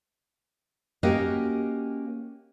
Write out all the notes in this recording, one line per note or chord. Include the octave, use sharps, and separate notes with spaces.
A#3 C#4 F#4 G4 A#4 D#5